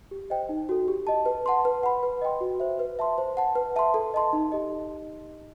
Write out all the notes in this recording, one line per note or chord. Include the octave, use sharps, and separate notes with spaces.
G4
C5 D#5 G5
D#4
F#4 A4
G4
D#5 A5
B4
F#5 A5 C6
B4
F#5 B5
B4
D#5 G5 C6
F#4
C5 E5
B4
E5 A5 C6
C5
F#5 A5
B4
E5 A5 C6
A4
D#5 A5 C6
D#4
G4 D#5